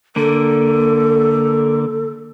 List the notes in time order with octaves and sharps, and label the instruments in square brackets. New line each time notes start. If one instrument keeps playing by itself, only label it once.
[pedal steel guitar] D3 A#3 [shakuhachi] A4